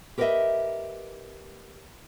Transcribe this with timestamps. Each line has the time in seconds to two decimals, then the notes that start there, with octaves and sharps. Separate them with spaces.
0.18 G4 A#4 B4 C#5 D#5 E5